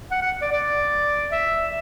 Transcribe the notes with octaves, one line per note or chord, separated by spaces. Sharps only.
F#5
F#5
D5
D5
E5